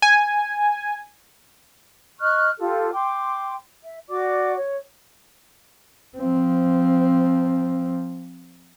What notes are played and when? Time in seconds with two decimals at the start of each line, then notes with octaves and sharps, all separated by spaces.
0.02 G#5
2.20 D#5 C#6 F6 F#6
2.59 F4 G4 A4
2.93 G5 C6 D6
3.82 E5
4.09 F#4 D5 D6
4.56 C#5
6.18 F3 C4